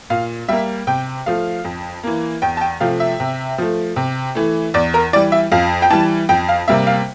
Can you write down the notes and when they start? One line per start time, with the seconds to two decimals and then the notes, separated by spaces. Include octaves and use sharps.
0.10 A#2 F5
0.48 G3 A#3 E5
0.87 C3 G5
1.26 F3 A3 F5
1.65 F2
2.04 E3 A#3
2.42 E2 G5
2.57 A5
2.61 G5
2.80 C3 F3 A3 F5
3.00 E5
3.20 C3
3.58 F3 A3
3.96 C3
4.35 E3 A3
4.74 E2 D5
4.94 A#4
5.13 E3 D5
5.16 G3
5.32 E5
5.52 F2 F5
5.82 G5
5.90 E3 G3 A5
6.29 F2 G5
6.49 F5
6.68 C3 G3 A#3 E5
6.87 F5